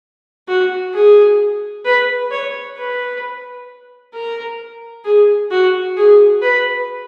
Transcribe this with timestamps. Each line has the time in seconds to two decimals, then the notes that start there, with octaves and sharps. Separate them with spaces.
0.48 F#4
0.94 G#4
1.85 B4
2.31 C#5
2.77 B4
4.14 A#4
5.05 G#4
5.51 F#4
5.97 G#4
6.42 B4